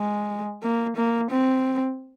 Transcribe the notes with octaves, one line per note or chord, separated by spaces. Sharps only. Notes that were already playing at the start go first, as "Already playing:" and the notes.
Already playing: G#3
A#3
A#3
C4